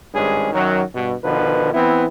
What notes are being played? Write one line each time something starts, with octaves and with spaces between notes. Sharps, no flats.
G#1 G2 G#3 C#4 G#4
F#2 D#3 F#3
G2 B2
B2 D3 D#3 F3 B4
E3 B3 C4 E4